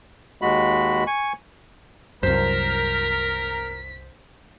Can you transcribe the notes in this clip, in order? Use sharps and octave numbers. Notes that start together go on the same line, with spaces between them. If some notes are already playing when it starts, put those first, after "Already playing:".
D#2 G#3 F#4 B5
G#5 C#6
C2 F#2 A#4 C5 B6